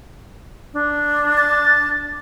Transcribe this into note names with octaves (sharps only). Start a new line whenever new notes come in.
D4
A6